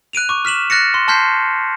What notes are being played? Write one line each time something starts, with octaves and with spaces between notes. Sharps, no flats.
F#6 D7 D#7 F7
C#6 D6
F6 B6 E7 F#7
F6 F#6 A6 A#6 C#7
C6
A5 C6 F6 G6 B6 C7